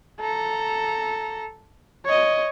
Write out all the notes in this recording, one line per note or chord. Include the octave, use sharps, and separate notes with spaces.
A4 A#5
C#5 D#5